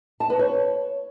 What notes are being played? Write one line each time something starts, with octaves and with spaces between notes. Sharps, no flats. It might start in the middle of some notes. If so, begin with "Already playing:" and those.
A5
B4
C#5